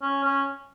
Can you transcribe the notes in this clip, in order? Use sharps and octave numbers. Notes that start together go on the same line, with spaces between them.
C#4
C#4